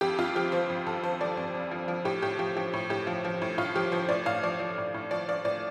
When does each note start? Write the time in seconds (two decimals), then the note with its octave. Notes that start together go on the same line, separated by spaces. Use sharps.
0.01 F2 G4
0.18 F2 F4
0.35 F3 G4
0.52 F3 C5
0.70 F2
0.86 F2 A4
1.03 F3 C5
1.21 F3 D5
1.37 F2 C5
1.54 F2
1.71 F3
1.88 F3
2.05 A2 G4
2.22 A2 G4
2.39 F3 G4
2.57 F3 G4
2.74 A2
2.90 A2 G4
3.07 F3
3.25 F3
3.42 A2
3.58 A2 F4
3.75 F3 G4
3.92 F3 C5
4.09 A2 D5
4.26 A2 F5
4.43 F3 D5
4.60 F3
4.78 A2
4.94 A2
5.11 F3 D5
5.28 F3 D5
5.45 A2 D5